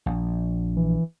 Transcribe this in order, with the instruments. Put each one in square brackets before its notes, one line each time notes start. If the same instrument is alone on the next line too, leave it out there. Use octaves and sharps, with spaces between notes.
[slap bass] A#1
[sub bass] E3